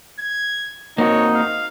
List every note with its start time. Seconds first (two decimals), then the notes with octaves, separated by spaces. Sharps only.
0.19 G#6
0.98 A#3 C4 D#4 F#4 C#5
1.35 F5